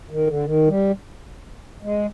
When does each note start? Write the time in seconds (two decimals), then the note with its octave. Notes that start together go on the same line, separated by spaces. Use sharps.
0.10 D#3
0.27 D3
0.45 D#3
0.68 G3
1.82 G#3